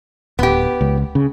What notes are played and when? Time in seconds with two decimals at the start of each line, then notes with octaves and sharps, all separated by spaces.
0.39 D1 B3 G4
0.81 C#2
1.15 C#3